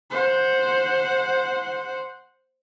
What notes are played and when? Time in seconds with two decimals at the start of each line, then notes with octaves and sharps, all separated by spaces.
0.10 C5 F#5